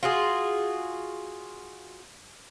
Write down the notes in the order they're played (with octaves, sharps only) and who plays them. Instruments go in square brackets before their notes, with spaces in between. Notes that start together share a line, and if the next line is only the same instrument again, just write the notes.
[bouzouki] F4 F#4 G#4